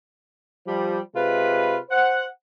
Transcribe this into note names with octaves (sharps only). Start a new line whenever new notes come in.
F3 G3
C3 G#3 F4 B4
C5 F#5